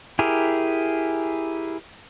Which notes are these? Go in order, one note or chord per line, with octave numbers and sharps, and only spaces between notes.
E4 G4 G#4 A#4